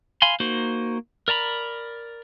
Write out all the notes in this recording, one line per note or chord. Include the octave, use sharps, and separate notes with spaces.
F5 G#5 B5 C6
A#3 D#4 F#4 C5
A#4 D5 A#5 B5